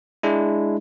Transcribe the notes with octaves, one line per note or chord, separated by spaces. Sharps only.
G#3 D4 E4